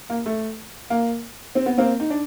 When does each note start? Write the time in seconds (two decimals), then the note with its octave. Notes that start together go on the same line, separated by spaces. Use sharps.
0.10 A#3
0.26 A3
0.90 A#3
1.55 C4
1.66 B3
1.78 A#3 C4
2.00 D#4
2.10 D4